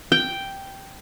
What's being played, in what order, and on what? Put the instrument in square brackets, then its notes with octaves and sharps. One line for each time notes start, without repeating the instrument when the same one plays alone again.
[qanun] G5